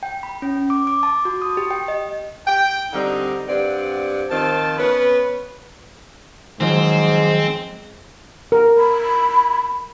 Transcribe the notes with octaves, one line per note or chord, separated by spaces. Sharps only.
G5
B5
C#4
D6
D6
A5
F#4
D#6
G4
G5
D#5
G5
D3 G3 C4 D4 D#4
G2 C4 D5 F#5
D#3 F3 C4 A5
B3 C#4 B4
G#2 D#3 F3 F#3 G#3 C4
A#4
B5